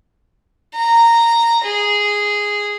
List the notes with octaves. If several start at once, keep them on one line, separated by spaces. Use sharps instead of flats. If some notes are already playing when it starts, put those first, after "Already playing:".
A#5
G#4